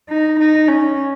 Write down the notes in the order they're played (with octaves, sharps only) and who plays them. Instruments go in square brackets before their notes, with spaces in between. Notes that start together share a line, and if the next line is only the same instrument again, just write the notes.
[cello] D#4
D#4
C#4